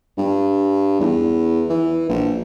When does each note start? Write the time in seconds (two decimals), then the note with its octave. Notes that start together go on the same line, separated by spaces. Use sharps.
0.18 G2
1.00 E2
1.69 E3
2.09 A#1